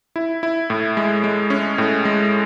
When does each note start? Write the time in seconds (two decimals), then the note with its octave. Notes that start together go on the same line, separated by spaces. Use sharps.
0.16 E4
0.43 E4
0.70 A2
0.97 G#3
1.24 G#3
1.50 C#4
1.78 A2
2.05 G#3